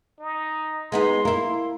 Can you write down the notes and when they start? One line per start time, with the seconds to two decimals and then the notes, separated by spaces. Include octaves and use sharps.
0.20 D#4
0.92 G#3 B3 D#4 C6
1.25 A#3 E4 A#4